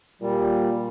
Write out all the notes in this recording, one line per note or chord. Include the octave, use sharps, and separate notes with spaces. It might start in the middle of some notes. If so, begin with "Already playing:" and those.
A#2 G3